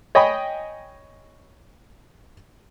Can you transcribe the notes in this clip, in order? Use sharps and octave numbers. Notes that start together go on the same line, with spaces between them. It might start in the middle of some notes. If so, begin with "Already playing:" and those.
C#5 D#5 G5 G#5 B5